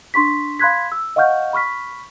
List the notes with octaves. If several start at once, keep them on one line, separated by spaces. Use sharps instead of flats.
D4 C6 C#6 B6
F5 B5 C6 F#6 G#6 B6
E6
D#5 F5 F#5 C#6 F6 G6
B5 C#6 F6 B6